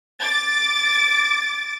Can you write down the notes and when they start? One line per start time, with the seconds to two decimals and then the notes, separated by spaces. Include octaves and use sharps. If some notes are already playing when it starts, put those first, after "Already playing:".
0.22 D6 A6